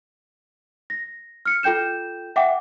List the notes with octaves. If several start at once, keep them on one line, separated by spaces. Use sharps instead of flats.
A#6
F6 C#7
F4 A4 G5 G6 E7
E5 F#5 G5 D6